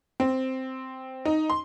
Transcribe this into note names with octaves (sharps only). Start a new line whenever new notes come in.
C4
D#4
C6